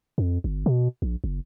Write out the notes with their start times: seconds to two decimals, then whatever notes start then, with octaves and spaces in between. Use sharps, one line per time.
0.18 F2
0.44 G1
0.66 B2
1.02 A#1
1.24 F#1